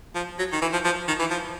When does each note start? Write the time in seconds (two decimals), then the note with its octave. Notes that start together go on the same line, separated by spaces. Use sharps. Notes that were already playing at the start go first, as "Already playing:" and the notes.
0.15 F3
0.39 F#3
0.52 D#3
0.62 E3
0.73 F3
0.85 F3
1.08 D#3
1.19 E3
1.30 F3